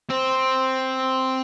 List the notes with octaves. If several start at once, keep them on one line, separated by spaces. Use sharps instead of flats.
C4